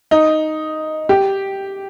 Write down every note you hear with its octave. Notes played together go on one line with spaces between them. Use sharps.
D#4
G4